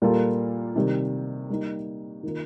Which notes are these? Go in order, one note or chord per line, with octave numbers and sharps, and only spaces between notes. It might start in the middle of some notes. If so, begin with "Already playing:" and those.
A#2 G3 A#3 F4 A4
C3 D#3 G3
G3 A#3 D#4
D#3 A#3 F4 A#4